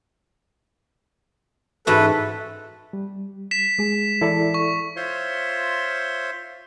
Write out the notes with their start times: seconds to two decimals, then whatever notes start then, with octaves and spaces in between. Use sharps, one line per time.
1.87 G#2 E3 F#4 A4 B4
2.93 G3
3.51 B6 E7
3.79 G#3 G#4
4.21 E3 E4 A4 D5
4.54 C#6
4.96 F4 C5 C#5 E5 C6